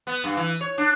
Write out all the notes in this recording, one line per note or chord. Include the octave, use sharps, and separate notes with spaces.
B3
G2
E3
C#5
D4